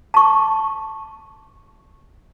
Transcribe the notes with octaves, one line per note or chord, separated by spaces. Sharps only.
A5 C#6